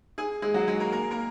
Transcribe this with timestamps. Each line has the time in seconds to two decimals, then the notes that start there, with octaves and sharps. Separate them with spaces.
0.18 G#4 G#5
0.42 G#3 G#4
0.54 F#3 F#4
0.67 G#3 G#4
0.80 A#3 A#4
0.92 A#3 A#4
1.11 A#3 A#4